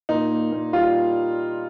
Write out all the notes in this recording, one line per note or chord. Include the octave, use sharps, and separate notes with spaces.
A#2 D#4
A#3
A#2
G3 F4